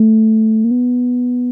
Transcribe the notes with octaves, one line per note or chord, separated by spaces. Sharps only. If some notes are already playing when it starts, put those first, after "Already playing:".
Already playing: A3
A#3
B3